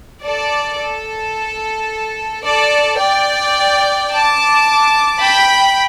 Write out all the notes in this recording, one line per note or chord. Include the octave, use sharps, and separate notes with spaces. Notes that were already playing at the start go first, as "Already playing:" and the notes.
A4 D5
A4
A4 D5
D5 G5
A5 D6
G5 B5